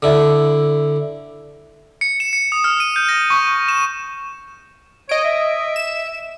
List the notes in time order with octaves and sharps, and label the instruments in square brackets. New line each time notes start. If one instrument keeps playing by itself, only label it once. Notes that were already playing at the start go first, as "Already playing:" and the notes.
[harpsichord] D3 E4
[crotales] C#7
E7
C#7
D#6
F6
D#7
G6
A#6
C#6
E7
[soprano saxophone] C#5 [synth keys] D#5 D7
[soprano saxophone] E5
[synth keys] E7